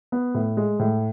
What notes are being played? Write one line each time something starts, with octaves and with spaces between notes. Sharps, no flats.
B3
A2
G#3
A2